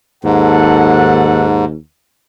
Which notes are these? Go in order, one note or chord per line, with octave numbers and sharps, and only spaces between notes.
D#2 G#2 A4 F#5